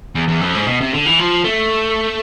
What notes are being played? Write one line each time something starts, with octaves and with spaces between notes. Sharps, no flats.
E2
E2
F2
G#2
B2
C3
D3
E3
F3
A3